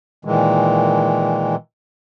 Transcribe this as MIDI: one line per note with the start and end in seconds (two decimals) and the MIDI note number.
0.25 1.55 46
0.25 1.55 51
0.25 1.55 52
0.25 1.55 56